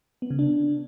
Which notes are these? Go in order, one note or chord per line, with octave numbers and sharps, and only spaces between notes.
B3
C#3
D4